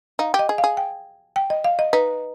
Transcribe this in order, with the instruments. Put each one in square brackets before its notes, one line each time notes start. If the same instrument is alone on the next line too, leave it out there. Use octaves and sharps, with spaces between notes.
[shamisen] D#4 [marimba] F5
[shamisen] G4
[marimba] D#5
[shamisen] G#4
[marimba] F5
[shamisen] G#4
[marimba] G5
G5
D#5
F5
D#5
[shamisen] D#4 [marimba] B4